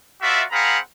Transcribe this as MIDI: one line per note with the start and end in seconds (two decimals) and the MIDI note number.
0.22 0.44 65
0.22 0.44 66
0.22 0.44 70
0.22 0.44 74
0.22 0.44 76
0.51 0.78 60
0.51 0.78 68
0.51 0.78 77
0.51 0.78 78
0.51 0.78 82
0.51 0.78 83